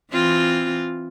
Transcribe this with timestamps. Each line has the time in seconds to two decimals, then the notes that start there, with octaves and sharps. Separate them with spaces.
0.12 E3 C4 F4